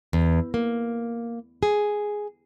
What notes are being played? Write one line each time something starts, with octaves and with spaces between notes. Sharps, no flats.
E2
A#3
G#4